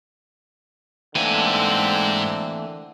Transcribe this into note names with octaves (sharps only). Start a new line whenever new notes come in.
G#2 D3 E3 A3 A#3 C4 G#5